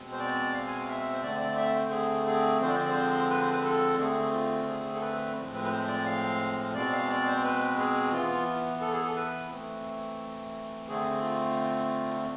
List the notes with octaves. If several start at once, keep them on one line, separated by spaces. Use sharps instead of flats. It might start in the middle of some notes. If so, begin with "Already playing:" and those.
Already playing: B2 G#3 C4
C5
D5
F5
G#5
F5
E5
C5
D3 A3 C4 D5
D5
E5
C5
G#4
G#4
D3 F3 G#3 C4 C5
D5
C5
D5
C5
B4
C5
B4
A4
D3 A3 C4 G#4
F4
G#4
A4
B4
A2 F3 G#3 C4
B4
B4
C5
D5
F5
B2 G#3 C4 D5
F5
D5
C5
B4
G#4
E3 B3 F4
A4
G#4
A4
B4
E3 A3 C4
D3 A3 C4 G#4
F4